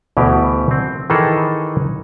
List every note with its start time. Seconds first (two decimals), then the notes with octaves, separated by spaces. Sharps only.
0.17 D2 B2 E3 G4
0.71 C4
1.10 D#3 E3 D#4 G#4 A4 G5